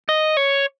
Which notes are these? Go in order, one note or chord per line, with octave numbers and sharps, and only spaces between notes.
D#5
C#5